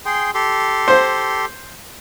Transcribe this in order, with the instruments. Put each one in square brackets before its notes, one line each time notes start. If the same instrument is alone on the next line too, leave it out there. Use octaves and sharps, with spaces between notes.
[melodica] G#4 G5 C6
G4 A4 C6
[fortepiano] C5